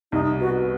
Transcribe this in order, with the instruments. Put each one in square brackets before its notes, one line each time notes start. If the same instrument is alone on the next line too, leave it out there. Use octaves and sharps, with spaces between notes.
[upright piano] C2 [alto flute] D#4
[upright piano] B3 [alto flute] F#4